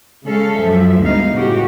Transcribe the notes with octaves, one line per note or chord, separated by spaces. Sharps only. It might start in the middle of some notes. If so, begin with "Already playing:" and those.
C#3 G#3 C#4 A4 F5
F#2 F3 E5
D2 G2 G#3 B3 D#4 F5
A2 C#3 B3 F#4 G4